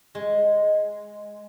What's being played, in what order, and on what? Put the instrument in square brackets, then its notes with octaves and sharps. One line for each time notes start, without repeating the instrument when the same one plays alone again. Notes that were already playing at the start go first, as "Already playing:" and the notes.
[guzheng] G#3